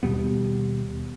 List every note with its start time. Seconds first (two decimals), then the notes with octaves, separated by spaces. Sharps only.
0.03 D#2 B2 G3 B3